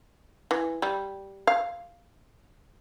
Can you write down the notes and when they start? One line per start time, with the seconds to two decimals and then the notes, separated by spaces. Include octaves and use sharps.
0.51 E3
0.82 G3
1.47 F5